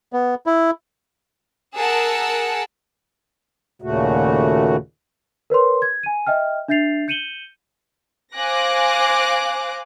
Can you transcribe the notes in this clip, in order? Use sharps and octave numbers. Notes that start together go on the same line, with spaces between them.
B3
E4
G#4 A#4 F#5 A5 E6
D#2 A#2 C#3 A3 F#4
A#4 B4 C#5 C6
G#6
G#5 D#7
D#5 E5 G5 F6
D4 E5 G6 A6 C7 F7
G6 C#7 D#7 E7 F#7 G7
C5 F5 G#5 D6 F#6 A#6